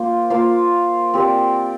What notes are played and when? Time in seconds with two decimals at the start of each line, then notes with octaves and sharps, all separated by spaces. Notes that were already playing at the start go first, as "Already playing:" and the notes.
Already playing: A#3 F4 C5
0.30 A#3 F4 C5 F5
1.14 C4 G4 A#4 D5